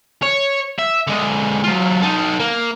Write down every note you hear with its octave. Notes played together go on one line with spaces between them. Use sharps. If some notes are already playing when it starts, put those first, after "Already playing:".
C#5
E5
D3 G#3
F#3 F4
D#4 A4
A#3